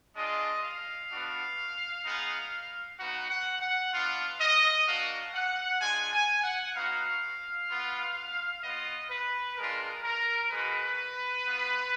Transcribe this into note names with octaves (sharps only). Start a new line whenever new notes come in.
G#3 D4 F4 D#5
F5
B3 D4 F#4
G#3 B3 D#4
B3 D#4 F#4 F#5
F#5
F#5
B3 D4 F4 F5
D#5
A#3 D4 F#4 F5
F#5
G#3 D4 F4 G#5
G#5
F#5
B3 D#4 F#4 F5
B3 F4
B3 F4 D#5
B4
G#3 D4 F4 A#4
A#4
G#3 D#4 F#4 B4
B3 F4